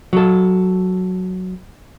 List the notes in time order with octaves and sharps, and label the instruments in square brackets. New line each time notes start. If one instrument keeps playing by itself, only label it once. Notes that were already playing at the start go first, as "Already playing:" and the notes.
[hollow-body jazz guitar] F#3 A4